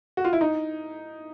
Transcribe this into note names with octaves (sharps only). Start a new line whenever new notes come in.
F#4
F4
E4
D#4